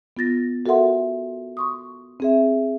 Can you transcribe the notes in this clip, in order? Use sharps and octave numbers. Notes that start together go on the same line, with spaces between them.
B3 F4 A6 A#6
F#4 A4 A#4 E5 F#5 C6
C6 C#6 D#6
C4 G#4 E5